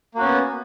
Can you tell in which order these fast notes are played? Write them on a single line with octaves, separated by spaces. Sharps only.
A#3 F#4 C#4 B3